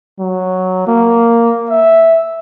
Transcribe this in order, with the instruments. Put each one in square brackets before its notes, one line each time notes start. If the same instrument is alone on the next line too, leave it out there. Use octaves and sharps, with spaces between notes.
[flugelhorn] F#3
A#3
E5